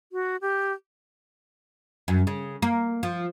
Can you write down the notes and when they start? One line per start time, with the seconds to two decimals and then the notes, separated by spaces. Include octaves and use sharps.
0.12 F#4
0.41 G4
2.08 F#2
2.27 C#3
2.62 A#3
3.03 F3